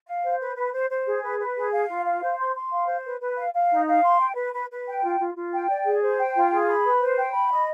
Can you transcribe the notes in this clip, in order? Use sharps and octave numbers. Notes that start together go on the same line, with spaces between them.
F5
C5
B4
B4
C5
C5
G#4
B4
B4
G#4
F5
F4
F5
C5
C6
C6
F5
C5
B4
B4
F5
F5
D#4
F5
C6
G5
B4
B4
B4
G5
F4
F4
F4
G5
D5
G#4
C5
G5
F4
G#4
B5
B4
C5
G5
B5
D#5